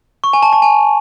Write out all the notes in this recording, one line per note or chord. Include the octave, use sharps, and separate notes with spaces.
C#6
G#5
A5
A5
G#5